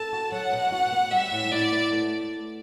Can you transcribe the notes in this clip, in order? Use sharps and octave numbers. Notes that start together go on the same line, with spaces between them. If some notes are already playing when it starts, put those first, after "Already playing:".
Already playing: A4 A5
F#4
F#3 F#5
B2
F#4
B3
G3 E5
A2
E4 D5
B3
A3